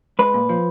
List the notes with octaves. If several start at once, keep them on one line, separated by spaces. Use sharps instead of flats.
G#3 B4
A#2
F3